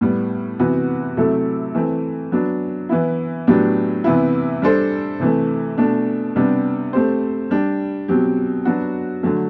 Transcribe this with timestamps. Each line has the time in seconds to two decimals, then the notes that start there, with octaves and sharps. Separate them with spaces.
0.01 A2 G3 B3
0.59 C3 E3 B3 F#4 B4
1.17 C3 F#3 A3 E4 A4
1.74 E3 A3 C4
2.32 F#3 B3 D4
2.89 E3 B3 E4
3.47 A2 F#3 B3 D4 G4
4.04 C3 E3 B3 E4
4.62 G3 D4 A4 C5
5.20 C3 E3 A3
5.78 B2 A3 D4
6.36 C3 G3 B3 D4 G4
6.93 A3 C4 G4 C5
7.51 G3 D4 G4
8.08 B2 F#3 C4 G4
8.65 F#3 B3 D4 F#4
9.23 D3 F#3 A3